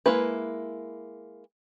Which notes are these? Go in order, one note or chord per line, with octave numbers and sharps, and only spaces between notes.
G#3 A#3 E4 B4